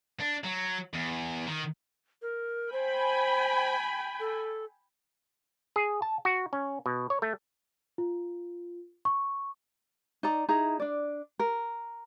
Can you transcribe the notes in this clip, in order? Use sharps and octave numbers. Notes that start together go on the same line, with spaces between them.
D4
F#3
E2
D#3
A#4
C5 G5 G#5 B5
A4
G#4
A5
F#4
C#4
B2
C#5
A3
F4
C#6
D#4 D5 A#5
D#4 E4 G#4 A#5
D4 D5
A#4